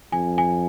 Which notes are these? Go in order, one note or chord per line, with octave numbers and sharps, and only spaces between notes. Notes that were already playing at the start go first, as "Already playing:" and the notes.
F2 G#5
G#5